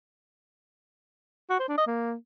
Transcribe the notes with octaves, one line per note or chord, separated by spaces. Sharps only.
F#4
C5
D4
D#5
A#3